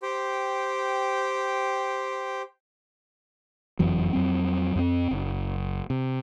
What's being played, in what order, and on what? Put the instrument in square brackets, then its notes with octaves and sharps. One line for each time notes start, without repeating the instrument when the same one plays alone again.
[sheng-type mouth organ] G4 C5 G5
[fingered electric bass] F#1 F2 E3 F#3
F2 F#3 C4
F2 B3 C4
F#1
C3